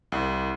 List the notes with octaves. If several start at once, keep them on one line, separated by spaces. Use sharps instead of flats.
C2